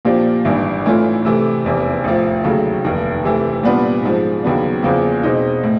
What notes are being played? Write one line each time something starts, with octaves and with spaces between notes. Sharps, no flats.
A#2 F3 A#3 D4 G4
G#1 G2 E3
A2 E3 A3 C#4 F4
C3 E3 A3
F1 E2 C3 E3
A1 A2 F3
D#2 C#3 F#3 A3
F1 D#2 D#3
C3 E3 A3
A#2 G3 B3 D4 F4
G#2 F3 G#3
D#2 C#3 F#3 B3 D4
E2 C#3 F3 A#3
B2 G#3 C4 D#4
A2